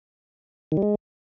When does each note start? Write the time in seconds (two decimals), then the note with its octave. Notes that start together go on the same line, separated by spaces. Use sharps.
0.72 D#3
0.77 G3
0.82 G#3